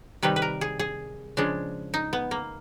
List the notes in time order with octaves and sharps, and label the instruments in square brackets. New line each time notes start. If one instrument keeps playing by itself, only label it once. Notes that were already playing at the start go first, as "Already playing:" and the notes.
[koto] C3 D#3 G3 B4
B4
A#4
G#4
G#4
C#3 F3 G#3 D4
D#4
B3
A#3